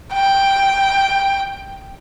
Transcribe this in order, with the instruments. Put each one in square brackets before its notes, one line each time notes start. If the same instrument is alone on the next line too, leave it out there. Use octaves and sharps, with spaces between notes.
[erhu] G5